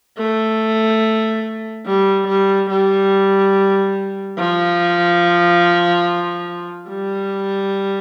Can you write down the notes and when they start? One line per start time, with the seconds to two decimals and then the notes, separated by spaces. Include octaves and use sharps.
0.18 A3
1.86 G3
2.28 G3
2.70 G3
4.38 F3
6.89 G3